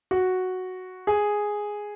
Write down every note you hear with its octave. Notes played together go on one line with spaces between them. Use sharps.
F#4
G#4